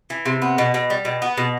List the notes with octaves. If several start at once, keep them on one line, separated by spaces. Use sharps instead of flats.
E3
C3
B3
B2
B2
G3
B2
B3
B2